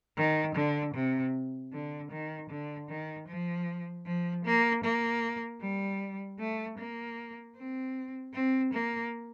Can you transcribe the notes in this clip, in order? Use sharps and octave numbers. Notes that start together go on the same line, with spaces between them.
D#3
D3
C3
D3
D#3
D3
D#3
F3
F3
A#3
A#3
G3
A3
A#3
C4
C4
A#3